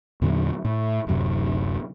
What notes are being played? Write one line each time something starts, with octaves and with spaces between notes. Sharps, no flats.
E2 A#2 D3 F#3
A2
D1 F#2 C3